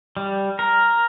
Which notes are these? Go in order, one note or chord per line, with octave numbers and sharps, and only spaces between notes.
G3
A#4